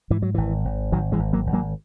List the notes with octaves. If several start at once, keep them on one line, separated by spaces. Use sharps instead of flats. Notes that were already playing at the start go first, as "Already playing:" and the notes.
G#2 E3
F#3
G#1 E3
G#1
G#1 D#3 F#3
E3 G#3
G#1
F#3 A#3
G#1
F#3 A#3